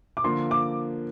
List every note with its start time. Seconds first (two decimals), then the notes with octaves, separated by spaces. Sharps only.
0.17 D6
0.24 D3 F3 A#3 C6
0.51 D6